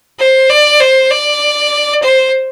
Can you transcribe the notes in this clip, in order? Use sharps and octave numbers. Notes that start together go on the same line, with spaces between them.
C5
D5
C5
D5
C5